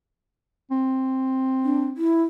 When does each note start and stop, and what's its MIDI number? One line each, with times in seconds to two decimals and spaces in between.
0.71 1.98 60
1.64 1.84 62
1.97 2.23 64